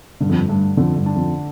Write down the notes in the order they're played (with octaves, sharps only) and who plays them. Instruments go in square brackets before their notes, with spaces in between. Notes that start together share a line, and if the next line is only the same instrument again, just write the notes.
[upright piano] G2 [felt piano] D3
[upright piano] F2
G2
[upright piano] G2 [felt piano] A3
[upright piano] F2 [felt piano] D3
[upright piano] G2
[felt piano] D4
[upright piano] F2